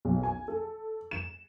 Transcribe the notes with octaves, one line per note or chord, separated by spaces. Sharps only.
B1
G#5
A4
E7